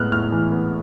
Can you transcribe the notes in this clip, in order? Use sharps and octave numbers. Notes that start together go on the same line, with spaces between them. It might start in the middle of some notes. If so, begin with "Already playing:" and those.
Already playing: A2 G#3 B3 F6 F#6
A2 F6
E3
B3